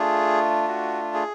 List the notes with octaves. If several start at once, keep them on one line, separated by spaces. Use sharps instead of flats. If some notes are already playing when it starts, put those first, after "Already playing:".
Already playing: A3 D4 F4 G#4
F#4
G#4